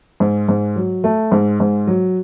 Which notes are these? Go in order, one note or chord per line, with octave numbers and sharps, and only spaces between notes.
G#2
G#2
F#3
A3
G#2
G#2
F#3